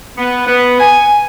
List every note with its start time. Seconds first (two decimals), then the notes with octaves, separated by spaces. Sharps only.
0.18 B3
0.47 B3
0.80 G#5